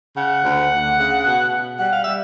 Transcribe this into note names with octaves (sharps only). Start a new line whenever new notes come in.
C#3 F#5
D2
D2
C#3
B2
B2
G3 F#5
F5
G3 E5